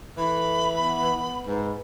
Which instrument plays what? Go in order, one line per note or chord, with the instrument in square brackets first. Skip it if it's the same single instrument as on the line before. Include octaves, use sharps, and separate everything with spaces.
[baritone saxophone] E3 [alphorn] A3 [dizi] B5
[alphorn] B3
[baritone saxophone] G#2 [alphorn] B4